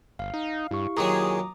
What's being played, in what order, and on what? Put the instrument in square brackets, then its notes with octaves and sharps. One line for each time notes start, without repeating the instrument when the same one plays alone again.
[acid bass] G1 [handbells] F5
[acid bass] D#4
[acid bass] G2 [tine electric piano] E4 G4 C#6
[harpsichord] A#2 D#3 F#3 [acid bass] G#4 [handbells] A#5 D6 D#6